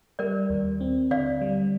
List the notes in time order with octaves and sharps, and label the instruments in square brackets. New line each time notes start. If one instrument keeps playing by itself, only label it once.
[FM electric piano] G3 [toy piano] A#4 D5
[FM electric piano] D#2
C4
[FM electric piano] D3 [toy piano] D5 F5
[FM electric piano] G3